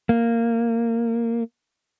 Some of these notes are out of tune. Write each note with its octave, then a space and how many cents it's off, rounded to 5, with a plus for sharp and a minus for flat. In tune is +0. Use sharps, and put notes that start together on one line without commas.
A#3 -10